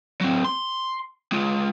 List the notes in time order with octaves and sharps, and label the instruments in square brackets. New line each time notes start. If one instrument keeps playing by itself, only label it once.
[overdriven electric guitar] F#3 C4
C6
G#3 F4